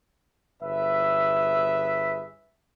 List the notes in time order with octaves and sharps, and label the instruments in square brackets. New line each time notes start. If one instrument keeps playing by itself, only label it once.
[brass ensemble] G1 G#4 B4 E5